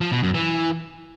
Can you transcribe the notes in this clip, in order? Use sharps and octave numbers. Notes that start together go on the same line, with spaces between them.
F3
B2
F#2
E3